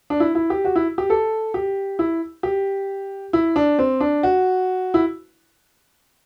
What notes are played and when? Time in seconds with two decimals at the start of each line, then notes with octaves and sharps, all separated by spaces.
0.10 D4
0.20 E4
0.35 E4
0.50 G4
0.65 F#4
0.76 E4
0.98 G4
1.10 A4
1.54 G4
1.99 E4
2.43 G4
3.33 E4
3.56 D4
3.79 C4
4.00 D4
4.23 F#4
4.94 E4